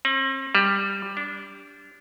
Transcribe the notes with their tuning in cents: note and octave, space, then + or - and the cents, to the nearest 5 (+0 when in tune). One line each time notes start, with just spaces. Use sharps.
C4 +40
G3 +10
D4 -20